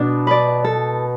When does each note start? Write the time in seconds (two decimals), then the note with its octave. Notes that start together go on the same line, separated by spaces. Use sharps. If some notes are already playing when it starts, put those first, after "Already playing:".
Already playing: B2 B3 D4
0.27 B4 D5
0.64 A4